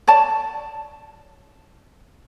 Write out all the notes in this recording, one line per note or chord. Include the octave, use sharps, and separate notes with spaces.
C#5 D5 A5